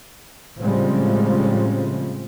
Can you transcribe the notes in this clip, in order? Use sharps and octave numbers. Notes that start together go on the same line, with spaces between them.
A2 C#3 F3 G3 G#3 C4